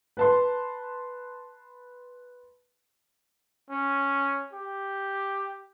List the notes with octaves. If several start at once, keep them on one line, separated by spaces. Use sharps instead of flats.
B4 A5 C6
C#4
G4